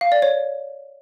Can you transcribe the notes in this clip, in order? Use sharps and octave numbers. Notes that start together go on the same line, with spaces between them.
F5
D5
C#5